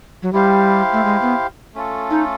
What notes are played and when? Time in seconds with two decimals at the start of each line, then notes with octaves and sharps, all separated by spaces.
0.22 F#3
0.33 G3 E4 G4 C5 F5
0.93 A3
1.04 G#3
1.22 B3
1.75 A3 C#4 F4 A4
2.10 D#4